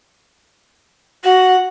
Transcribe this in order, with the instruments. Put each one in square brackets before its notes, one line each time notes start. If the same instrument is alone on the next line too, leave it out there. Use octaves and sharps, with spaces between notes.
[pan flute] F#4 [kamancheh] F#5